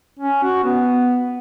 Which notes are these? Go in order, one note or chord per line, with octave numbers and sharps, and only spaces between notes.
C#4
F#4
B3